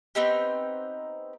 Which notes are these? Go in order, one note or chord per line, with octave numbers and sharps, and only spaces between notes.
B3 C4 D#4 G4